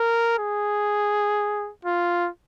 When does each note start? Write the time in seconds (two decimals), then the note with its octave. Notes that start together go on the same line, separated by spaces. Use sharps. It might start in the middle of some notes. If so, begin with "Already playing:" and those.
Already playing: A#4
0.39 G#4
1.85 F4